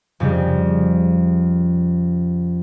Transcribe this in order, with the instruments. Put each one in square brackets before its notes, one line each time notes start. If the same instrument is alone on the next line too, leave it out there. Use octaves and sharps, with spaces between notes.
[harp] F2 C#3 G3